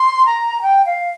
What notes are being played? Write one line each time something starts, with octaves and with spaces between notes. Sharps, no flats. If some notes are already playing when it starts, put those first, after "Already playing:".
Already playing: C6
A#5
G5
F5